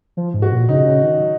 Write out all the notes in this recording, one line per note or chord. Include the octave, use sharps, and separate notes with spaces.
F3
G#2
F#4
A#2
C#3 D#4
C#3
D#3
F#3